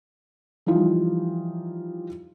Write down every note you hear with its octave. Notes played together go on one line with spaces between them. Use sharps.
E3 F3 G3 D#4 F4